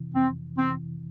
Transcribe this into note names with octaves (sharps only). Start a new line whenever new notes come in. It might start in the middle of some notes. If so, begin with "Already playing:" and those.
Already playing: F2 C3 E3
F2 C4
C3 E3 C4